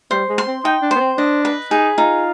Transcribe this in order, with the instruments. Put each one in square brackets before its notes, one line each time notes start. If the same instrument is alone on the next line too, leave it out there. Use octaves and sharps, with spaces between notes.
[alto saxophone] G3 [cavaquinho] C5
[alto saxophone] G#3
[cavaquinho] C6
[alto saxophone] C4
[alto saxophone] D#4 [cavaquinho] G5
[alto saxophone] D4
[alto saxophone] B3 [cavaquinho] C5
[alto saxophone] C4
[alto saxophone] D4 [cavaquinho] D#5
[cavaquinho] B4
[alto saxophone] D#4 [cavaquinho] G#4
[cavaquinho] D#4 [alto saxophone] F4